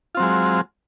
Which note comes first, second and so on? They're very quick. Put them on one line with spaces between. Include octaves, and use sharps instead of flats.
F4 C4 F#3 G#3